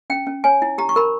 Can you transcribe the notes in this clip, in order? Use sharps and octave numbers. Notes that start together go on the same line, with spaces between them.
C#4 G5
C#4
C#5 G#5
E4
G4 A#5
C#6
A#4 B5